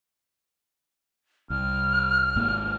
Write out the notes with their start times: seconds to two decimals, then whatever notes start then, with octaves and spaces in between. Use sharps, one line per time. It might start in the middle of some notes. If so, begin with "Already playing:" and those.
1.50 C2 F6
2.36 G#1 G#2 A#3